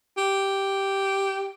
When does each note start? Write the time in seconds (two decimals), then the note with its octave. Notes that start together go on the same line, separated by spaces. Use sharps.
0.17 G4